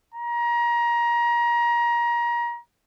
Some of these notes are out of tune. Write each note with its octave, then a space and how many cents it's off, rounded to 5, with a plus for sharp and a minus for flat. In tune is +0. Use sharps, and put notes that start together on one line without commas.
A#5 +25